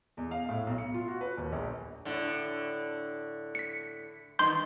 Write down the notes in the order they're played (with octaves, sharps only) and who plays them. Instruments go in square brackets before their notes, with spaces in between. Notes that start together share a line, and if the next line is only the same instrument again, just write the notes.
[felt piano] E2
F5
A2
B1
C#7
F4
F#4
B4
D#2
A#1
[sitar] A2 D3
[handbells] B6 C#7
[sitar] G2 D#3 [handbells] C6 G6